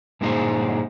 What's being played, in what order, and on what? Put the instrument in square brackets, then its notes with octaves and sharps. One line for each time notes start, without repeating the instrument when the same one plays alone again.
[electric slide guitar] G2 A#2 D3 D#4 G#4 C5